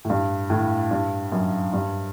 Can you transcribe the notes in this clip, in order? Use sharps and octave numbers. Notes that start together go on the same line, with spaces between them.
A2
G2
A2
G2
F#2
G2